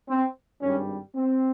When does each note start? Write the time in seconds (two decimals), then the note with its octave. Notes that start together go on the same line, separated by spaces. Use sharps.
0.09 C4
0.62 G#1 G2 G3 C#4
1.14 C4